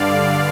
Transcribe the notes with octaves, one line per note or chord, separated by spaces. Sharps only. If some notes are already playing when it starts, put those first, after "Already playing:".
Already playing: G2 D3 D5 F5